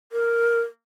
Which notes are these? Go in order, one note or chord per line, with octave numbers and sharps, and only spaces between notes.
A#4